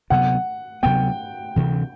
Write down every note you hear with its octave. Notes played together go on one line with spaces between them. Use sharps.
D2 C3 F#3 B3 F#5
D2 C3 F#3 B3 G5
D2 C3 E3